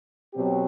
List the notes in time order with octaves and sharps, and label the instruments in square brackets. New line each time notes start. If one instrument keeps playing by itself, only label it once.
[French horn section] B2 F#3 C4 G4